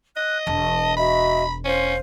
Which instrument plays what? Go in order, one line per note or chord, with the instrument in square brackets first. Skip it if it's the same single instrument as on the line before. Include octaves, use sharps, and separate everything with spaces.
[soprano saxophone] D#5 [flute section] F#6
[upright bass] E1 [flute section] A5
[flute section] F#4 D#5 E5 [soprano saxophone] B5
[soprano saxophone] C#4 [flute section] C5 F5